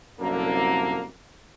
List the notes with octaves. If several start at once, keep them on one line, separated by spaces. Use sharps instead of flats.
C2 F#2 D3 A#3